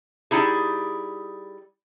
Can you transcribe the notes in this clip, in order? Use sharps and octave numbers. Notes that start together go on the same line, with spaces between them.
G3 D#4 E4 G#4